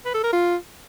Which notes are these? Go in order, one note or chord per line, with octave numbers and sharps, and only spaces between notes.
B4
A4
A#4
F4